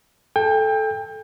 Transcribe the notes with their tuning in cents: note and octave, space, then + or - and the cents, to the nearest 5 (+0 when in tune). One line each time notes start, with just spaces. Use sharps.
A4 -10 G5 +30